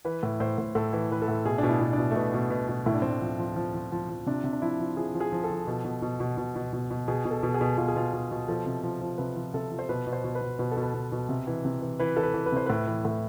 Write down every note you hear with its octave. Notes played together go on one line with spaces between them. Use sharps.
E3 B4
A2
A2 C5
A2
A2 A4
E3
E3 B4
A4
A2
B2 G#4
B2 D4
E4
B2
D4
B2
A3
B2 B3
B2
B2
B2
A2 E4
D4
A2 C4
D4
F3
F3
F3
F3
F3
F3
C3 D4
C3
D4
F3 E4
F3
F3 G#4
F3
G#4
F3
A4
F3
B2
B2
B2
B2
B2
B2
B2
B2
B2 G#4
B2
A4
B2
G#4
B2
B2 F4
G#4
B2 F4
B2
B2
F3 A4
C3
F3
F3
C3 B4
F3
C3 A4
F3
C5
B2 B4
B2
C5
B2
B4
B2
B2 B4
A4
B2
B4
B2
B2
C3
E3
C3
E3
E3 B4
E3 A4
B4
E3
B4
C3 C5
A2 B4
E3
A2